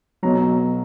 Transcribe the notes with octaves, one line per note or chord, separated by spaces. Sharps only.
B1 B2 F#3 A#5